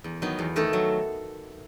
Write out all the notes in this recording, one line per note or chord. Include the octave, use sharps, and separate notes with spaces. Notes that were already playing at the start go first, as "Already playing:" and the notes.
E2
D#3 F#3 B3 D#4
E2
D#3 A3 D#4 A4
F#3